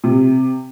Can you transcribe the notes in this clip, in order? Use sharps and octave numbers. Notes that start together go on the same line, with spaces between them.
C3